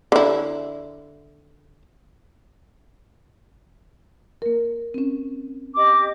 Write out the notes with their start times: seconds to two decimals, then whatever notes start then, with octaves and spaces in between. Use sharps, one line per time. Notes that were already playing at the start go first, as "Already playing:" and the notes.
0.12 D3 E4
4.42 A#3 A#4
4.94 C4 C#4
5.77 G4 D#5 D6